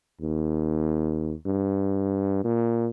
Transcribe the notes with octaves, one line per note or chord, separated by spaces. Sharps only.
D#2
G2
A#2